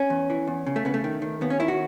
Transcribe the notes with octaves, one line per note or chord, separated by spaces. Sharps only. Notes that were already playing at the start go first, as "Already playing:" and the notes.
Already playing: C#4
E2
E3
E2
C#3
A3
C#3 B3
A3
D#3
D#3
D#2 B3
C#4
D#3 E4
F#4